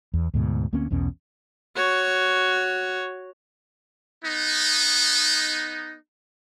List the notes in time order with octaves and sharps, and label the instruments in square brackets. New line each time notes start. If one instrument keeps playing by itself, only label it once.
[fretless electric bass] E2
D2 G#2 B2
D2 A#3 C4 C#4
B1 E2 B2 C#4
[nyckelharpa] F#4 C#5
[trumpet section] B3 D#4